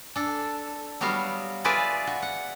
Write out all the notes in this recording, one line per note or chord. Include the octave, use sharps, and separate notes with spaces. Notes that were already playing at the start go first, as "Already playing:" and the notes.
D4 A4
F#3 G3 B3 F#4 F5
F4 G#4 B4 D5 E5
F#4
F#5